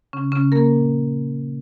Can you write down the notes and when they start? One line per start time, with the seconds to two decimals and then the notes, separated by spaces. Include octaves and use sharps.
0.13 C#3 C#4
0.32 C#3 C#4
0.52 A#3 A#4
0.72 A#2 F3